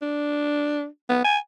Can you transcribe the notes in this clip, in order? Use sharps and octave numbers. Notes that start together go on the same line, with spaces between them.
D4
B3
G#5